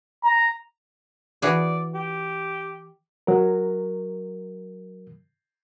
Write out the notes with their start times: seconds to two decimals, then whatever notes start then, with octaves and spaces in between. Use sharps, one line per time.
0.24 A#5
1.42 E3 F#4 G#4 D5
1.95 G4
3.27 F#3 A#4